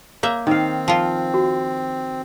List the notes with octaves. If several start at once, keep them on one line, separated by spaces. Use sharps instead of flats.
A#3 C#5 E5
D#3 C4 F5
F3 F4
F#4